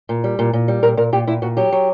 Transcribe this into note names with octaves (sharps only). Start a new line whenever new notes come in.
A#2
G3
A#2
A#2
G3
A#2 A#4
A#2 A#4
A#2 G4
A#2 E4
A#2 F#4
F#3 G4
F#3